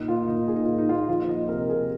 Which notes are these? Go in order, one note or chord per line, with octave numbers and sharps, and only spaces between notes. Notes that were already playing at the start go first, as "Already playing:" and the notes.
Already playing: A#2 D#4
A#3 F4
A#2 D#4
A#3 G#4
D#4
A#2 F4
D#4
A#3 D#4 F4
F3 F4
A#3 D#5
C3 A#4
C3 G#4